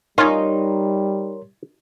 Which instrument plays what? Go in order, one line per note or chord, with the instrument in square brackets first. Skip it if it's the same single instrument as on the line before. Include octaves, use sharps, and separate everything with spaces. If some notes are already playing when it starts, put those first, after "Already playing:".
[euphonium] G3 [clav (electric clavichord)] C#4 F4 [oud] D#4 [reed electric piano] A#4 C#5 C6